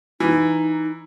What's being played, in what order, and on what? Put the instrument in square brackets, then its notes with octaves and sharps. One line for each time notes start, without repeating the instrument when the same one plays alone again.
[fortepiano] E3 [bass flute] D#4